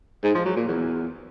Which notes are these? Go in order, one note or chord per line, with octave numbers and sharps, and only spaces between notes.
G#2
F3
F#3
A#2
E2